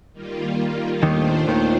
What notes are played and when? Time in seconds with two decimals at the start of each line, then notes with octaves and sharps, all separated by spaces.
0.12 D#3 G3 A#3 F4
1.03 D#2 A#2 D#3 A3 D4 F4 C5
1.48 D#2 D#3